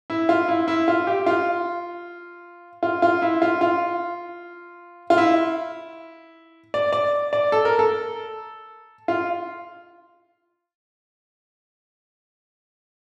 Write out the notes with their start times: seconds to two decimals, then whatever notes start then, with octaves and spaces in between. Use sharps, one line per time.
0.10 E4
0.29 F4
0.48 E4
0.68 E4
0.88 F4
1.07 G4
1.26 F4
2.83 F4
3.02 F4
3.22 E4
3.42 F4
3.61 F4
5.10 F4
5.18 E4
6.74 D5
6.93 D5
7.33 D5
7.52 A4
7.65 A#4
7.79 A4
9.08 F4